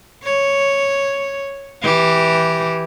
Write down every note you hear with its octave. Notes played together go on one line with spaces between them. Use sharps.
C#5
E3 G4